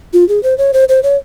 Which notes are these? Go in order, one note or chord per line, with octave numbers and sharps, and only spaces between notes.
F4
G#4
C5
C#5
C5
C5
C#5